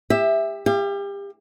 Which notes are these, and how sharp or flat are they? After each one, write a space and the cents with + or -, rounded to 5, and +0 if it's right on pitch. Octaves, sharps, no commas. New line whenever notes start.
G4 +30 E5 +0
G4 +30 F5 -40